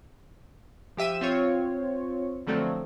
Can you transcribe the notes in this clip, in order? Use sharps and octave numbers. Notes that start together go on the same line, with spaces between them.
F3 G4 E5 D#7 E7
C4 F4 C#5
D3 F3 F#3 A3 C4 D4